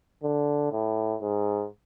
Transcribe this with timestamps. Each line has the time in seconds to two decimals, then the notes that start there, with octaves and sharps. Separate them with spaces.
0.23 D3
0.72 A2
1.22 G#2